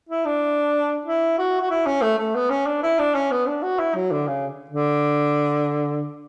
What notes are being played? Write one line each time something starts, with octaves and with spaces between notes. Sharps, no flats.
E4
D4
E4
F#4
F#4
E4
C#4
A3
A3
B3
C#4
D4
E4
D4
C#4
B3
D4
F#4
E4
F#3
D3
C#3
D3